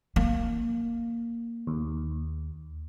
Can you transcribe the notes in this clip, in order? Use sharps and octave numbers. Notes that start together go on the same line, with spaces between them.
A#3
D#2